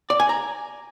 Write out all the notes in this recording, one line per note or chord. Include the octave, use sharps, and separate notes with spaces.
D5
G#5
A#5